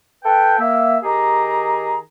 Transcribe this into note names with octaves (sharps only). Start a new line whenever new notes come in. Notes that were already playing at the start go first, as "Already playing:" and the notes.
A4 B4 G5
A#3 E5
D#3 G4 G#4 A#5